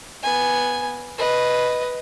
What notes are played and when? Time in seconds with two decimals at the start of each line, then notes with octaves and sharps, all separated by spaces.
0.23 B3 G#5
1.18 B4 D#5